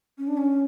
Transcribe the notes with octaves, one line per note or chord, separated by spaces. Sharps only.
C#4
D4
C#4